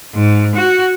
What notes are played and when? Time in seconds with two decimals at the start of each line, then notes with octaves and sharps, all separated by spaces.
0.14 G#2
0.56 F#4